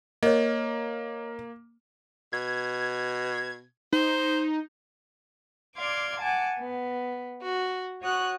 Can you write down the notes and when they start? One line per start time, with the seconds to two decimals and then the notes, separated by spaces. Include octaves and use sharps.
0.23 A#3 A#4 C#5 D#5
2.33 B2 G#6
3.93 D#4 C5
5.78 D5 F5 C6 D6 G#6
6.20 F#5 G#5 A5 D6
6.58 B3
7.42 F#4
8.01 F#4 C#5 D#6 F#6